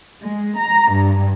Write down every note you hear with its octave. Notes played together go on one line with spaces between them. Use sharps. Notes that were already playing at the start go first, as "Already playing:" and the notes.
G#3
A#5
G2